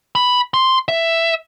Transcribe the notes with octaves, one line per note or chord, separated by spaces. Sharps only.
B5
C6
E5